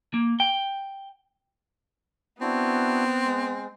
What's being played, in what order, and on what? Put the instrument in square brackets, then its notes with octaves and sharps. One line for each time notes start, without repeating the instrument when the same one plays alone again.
[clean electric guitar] A#3
G5
[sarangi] B3 [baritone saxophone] C4 [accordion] D4 E4 F#4
[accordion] G#3